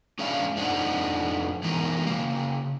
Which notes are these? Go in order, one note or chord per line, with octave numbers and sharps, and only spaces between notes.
G#3 C#4 D4 G#4 E5 F5
F2 D4 D#4 C5 D#5 F#5
E3 G#3 B3 D#4 A#4
C#3 A#3